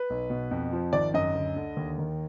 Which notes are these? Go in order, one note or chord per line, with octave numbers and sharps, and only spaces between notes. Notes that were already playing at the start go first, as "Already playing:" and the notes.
Already playing: B4
B1
B2
F2
F3
G#1 D5
F#2 D#5
D2
D3
D#2
D#3